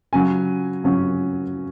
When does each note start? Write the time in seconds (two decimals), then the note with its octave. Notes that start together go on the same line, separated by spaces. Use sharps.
0.13 C#3 F#3 C#4 G#5
0.84 C#3 F#3 C#4